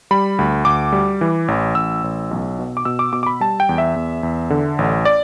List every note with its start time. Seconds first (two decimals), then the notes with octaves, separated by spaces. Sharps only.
0.11 G3 B5
0.39 D2
0.65 D2 D6
0.93 G3
1.21 E3
1.48 A1
1.75 A1 E6
2.04 A1
2.31 B1
2.59 B2
2.77 D6
2.85 B2 E6
2.99 D6
3.13 B2 D6
3.23 D6
3.26 B5
3.41 G3 A5
3.60 G5
3.69 E2
3.78 E5
3.96 E2
4.23 E2
4.50 D3
4.78 A1
5.05 D5